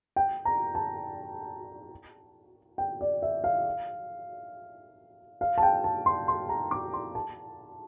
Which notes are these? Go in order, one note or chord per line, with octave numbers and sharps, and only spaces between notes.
G5
A#5
A5
G5
D5
E5
F5
F5
A5
G5
A5
C6
C6
A#5
D6
C6
A5